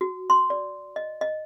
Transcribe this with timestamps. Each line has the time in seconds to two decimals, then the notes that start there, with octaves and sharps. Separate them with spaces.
0.01 F#4
0.30 C6
0.50 D5
0.96 D#5
1.21 D#5